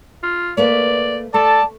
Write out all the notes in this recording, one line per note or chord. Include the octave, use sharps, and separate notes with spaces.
F4
A3 A#3 B4 D5
A3 A4 D5 A5